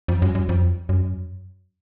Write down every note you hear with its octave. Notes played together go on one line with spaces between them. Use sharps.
F2
F#2
F#2
F2
F#2